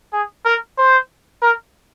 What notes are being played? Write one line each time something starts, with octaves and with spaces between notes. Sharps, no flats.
G#4
A#4
C5
A#4